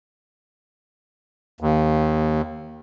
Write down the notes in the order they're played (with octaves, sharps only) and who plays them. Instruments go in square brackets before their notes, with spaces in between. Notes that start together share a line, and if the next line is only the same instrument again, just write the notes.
[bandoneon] D#2